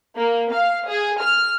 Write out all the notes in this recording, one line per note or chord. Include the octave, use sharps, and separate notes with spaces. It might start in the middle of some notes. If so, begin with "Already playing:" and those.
A#3
F5
G#4
F6